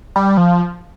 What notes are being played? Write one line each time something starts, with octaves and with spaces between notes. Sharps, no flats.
G3
F3